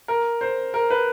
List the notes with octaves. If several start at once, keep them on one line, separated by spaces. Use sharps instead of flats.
A#4
C5
A#4
B4